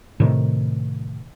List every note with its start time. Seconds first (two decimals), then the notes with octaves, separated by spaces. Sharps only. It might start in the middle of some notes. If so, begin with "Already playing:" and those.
0.20 A2 C3 D#3